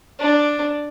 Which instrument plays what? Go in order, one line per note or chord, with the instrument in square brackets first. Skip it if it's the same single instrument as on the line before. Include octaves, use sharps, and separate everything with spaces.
[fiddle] D4